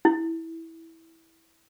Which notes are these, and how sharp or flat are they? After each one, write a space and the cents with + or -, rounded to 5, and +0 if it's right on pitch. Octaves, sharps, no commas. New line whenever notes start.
E4 -10